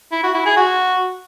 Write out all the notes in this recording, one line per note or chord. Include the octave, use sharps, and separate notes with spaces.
E4
F#4
E4
G#4
F#4